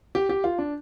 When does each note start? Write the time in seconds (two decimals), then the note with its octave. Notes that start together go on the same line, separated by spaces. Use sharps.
0.15 G4
0.29 G4
0.44 F4
0.58 D4